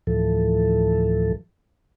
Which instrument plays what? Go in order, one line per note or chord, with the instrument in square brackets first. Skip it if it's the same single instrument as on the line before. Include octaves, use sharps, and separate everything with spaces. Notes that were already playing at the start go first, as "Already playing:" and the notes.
[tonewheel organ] D2 A2 E3 F3 A4